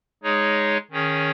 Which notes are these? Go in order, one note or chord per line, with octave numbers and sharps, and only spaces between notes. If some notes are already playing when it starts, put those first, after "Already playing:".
G#3 D#4 G#4 C#5
D#3 C#4 G#4 C#5